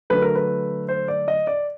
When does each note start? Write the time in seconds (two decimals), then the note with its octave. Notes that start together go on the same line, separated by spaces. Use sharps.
0.10 D3 F#3 A3 B4
0.22 A#4
0.35 B4
0.89 C5
1.08 D5
1.28 D#5
1.47 D5